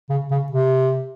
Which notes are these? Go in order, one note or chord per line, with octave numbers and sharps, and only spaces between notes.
C#3
C#3
C3